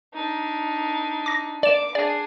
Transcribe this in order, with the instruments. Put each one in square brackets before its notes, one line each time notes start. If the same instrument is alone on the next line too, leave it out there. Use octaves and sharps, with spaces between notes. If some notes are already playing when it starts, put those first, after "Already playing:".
[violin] D4 D#4
[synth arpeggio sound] D6 A#6
[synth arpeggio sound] D5 E7 [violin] D6
[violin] D4 G#4 [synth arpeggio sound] D5